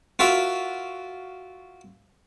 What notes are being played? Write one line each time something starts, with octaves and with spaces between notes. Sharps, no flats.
F4 F#4 A#4 E5